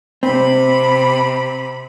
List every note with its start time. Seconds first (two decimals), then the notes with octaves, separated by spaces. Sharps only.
0.23 C3 C4 B5